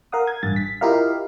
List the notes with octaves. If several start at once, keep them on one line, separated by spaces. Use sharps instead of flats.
A#4 F5 F#5 D#6
G#6
A1 G2 A6
B6
E4 F4 G4 A#4 D#5 F5